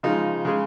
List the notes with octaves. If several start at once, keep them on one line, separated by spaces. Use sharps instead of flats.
C#3 F3 G#3 D#4
C#3 G#3